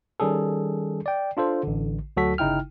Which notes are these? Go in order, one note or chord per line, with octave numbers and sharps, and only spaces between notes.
D#3 G3 C#4 G#4 A4
D5 G5
D4 F4 A4 C5
A1 D3
D2 F#3 F#4 A4 B6
G1 C#3 D#4 E4 G5 F6